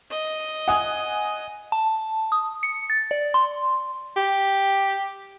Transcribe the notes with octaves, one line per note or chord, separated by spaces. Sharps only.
D#5
F#5 G#5 D#6
A5
D#6
C#7
A6
D5
C6
G4